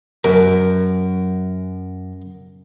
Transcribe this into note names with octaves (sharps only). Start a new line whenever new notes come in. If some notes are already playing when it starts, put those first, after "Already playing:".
F#2 A#4